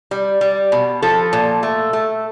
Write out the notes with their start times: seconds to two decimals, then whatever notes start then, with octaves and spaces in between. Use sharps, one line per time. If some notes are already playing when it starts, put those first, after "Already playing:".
0.11 G3
0.41 G3
0.72 B2
1.02 F3 A4
1.33 A#2
1.63 A3
1.93 A3